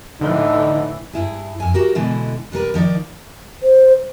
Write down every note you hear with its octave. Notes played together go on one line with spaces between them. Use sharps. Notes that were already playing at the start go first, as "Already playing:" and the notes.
A2 D3 E3 D#4
G2 E4 G#4
F2 G#5
F#4 G4 A#4
B2 D3 E3 G#3
C3 G3 A#4 B4
D#3 F3 D#4 D5
C5